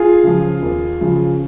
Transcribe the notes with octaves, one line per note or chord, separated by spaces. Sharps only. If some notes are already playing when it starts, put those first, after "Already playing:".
Already playing: F4 G#4
C#3 F3
D#2
C#3 F3